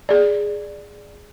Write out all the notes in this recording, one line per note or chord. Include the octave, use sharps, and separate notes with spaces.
G#4 D5